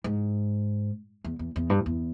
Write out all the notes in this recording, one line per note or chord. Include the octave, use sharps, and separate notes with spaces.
G#2
E2
E2
E2
G2
E2